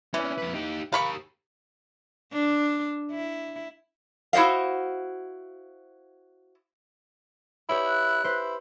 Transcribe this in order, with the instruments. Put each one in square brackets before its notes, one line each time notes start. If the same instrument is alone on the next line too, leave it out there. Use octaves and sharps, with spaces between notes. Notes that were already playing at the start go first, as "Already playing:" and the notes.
[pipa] E3 [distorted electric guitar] C#4 D4
[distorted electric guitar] F2 B4
D#4 G4
[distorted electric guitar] G4 A#4 [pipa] F5 B5 C#6
[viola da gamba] D4
E4
[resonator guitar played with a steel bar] E4 F#4 C5 D#5 F5
[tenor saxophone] E4 [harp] G4 B4 C#5
[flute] F#6
[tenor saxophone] E4 [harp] B4 C5